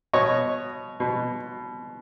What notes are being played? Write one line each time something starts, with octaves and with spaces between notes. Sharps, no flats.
B2 C#5 D#5
B2